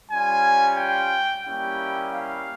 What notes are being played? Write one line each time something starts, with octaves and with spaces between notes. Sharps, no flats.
G3 C#4 F4 G#5
G5
G3 A#3 C#4 E4 G4 G5
F5